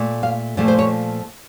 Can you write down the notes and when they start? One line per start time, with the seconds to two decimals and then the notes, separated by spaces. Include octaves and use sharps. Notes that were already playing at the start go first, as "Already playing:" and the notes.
Already playing: A#2 A3
0.23 F5
0.57 A#2 F3 A3
0.68 C5
0.79 C#5